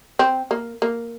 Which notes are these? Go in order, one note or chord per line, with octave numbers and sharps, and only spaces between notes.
C4
A#3
A#3